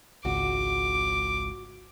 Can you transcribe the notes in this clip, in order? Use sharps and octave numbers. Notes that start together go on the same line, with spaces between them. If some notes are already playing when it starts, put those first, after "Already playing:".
G#1 C#2 F#4 D6